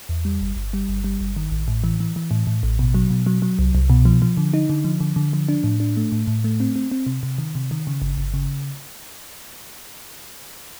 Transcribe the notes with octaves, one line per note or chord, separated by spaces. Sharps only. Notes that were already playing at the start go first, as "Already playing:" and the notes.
E2
G3
G1
G1
G3
G1
G3
G1
D#3
A1
A2
E3
E3
E3
A2
A2
A1
B2
F#3
B2
F#3
F#3
C2
C2
B2
F3
F3
D3
D#4
D3
F3
D3
D3
F3
D4
A2
D4
A3
A2
A2
A3
C4
C4
C4
C3
C3
D#3
C3
D#3
C#3
G1
G1
C#3